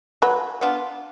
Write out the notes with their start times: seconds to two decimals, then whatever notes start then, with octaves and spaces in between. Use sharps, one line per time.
0.22 F#3 B4
0.61 B3 D4 F4